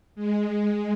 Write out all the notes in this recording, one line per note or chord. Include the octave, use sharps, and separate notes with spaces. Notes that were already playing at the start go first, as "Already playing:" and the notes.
G#3